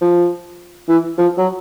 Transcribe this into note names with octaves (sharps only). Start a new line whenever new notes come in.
F3
E3
F3
F#3